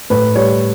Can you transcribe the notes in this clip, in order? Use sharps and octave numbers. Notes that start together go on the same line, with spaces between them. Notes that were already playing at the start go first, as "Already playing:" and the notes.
A2 B4
G3 C#5